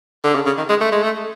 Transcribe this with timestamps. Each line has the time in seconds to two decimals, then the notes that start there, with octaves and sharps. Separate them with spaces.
0.24 D3
0.35 C#3
0.46 C#3
0.58 D#3
0.69 G#3
0.81 A3
0.92 G#3
1.03 A3